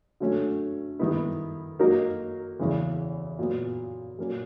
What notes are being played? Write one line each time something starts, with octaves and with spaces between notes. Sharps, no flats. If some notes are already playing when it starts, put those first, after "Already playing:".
D3 F#3 A3 C#4
D#3 G3 B3 E4
F#3 A#3 D#4 F#4 A#4
E2 C#3 E3
A#2 F#3 B3
A#2 F#3 A#3 C#4